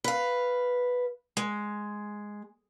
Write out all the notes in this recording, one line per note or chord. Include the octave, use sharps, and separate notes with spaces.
B4 F5
G#3